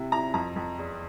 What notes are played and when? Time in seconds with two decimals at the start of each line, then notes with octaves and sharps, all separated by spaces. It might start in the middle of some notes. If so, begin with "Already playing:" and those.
Already playing: C3 E4
0.12 E4 A#5
0.34 F2 A#5
0.56 F2
0.78 E2